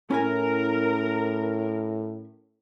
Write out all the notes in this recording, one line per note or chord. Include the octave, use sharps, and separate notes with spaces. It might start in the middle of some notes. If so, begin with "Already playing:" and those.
A2 C#4 E4 A#4 G#5